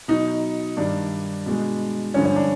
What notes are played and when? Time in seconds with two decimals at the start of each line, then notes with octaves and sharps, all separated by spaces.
0.08 B2 F#3 D#4
0.77 G2 D#3 G3 D4
1.46 B2 G#3
2.14 G2 D3 F3 C#4
2.25 C#4
2.36 D4